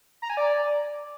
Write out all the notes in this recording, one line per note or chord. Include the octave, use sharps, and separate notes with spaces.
A#5
G#5
D5